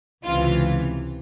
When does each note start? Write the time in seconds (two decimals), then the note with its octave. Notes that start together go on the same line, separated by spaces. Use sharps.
0.25 C#2 C3 E3 F4